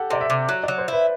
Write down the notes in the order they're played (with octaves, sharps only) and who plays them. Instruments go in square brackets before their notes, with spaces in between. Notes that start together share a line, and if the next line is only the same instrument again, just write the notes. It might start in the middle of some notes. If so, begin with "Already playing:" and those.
Already playing: [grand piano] G4 A4 F#5
[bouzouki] C3 [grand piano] D5
[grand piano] E5
[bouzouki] C3
F#3
[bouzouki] F#3 [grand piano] D5
[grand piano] C5
[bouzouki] E4 [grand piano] B4